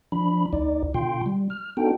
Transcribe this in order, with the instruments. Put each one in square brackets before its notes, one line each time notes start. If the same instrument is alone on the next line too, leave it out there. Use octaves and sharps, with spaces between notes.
[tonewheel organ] F3 D4 B5
D2 D#4 D5
B2 D3 F4 G5 C6
G3
F6
B3 D4 D#4 F#4 A4 G5